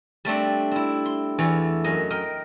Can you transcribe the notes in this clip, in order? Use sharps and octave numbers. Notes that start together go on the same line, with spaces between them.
G3 A3 C4 D4
C4 E4
C6
E2 E3 A3
F#2 D#5
A#4 D#5 G5